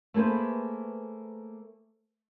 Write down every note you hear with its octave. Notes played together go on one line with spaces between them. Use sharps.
A3 A#3 G#4 B4 C5